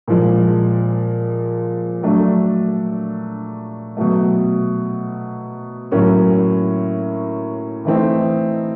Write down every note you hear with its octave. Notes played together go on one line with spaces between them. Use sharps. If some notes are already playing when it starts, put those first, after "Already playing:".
A#2 F3 G#3
F#3 A3 D4
B2 F#3 A3
A2 F#3 A#3 C#4
E3 A3 C4 D#4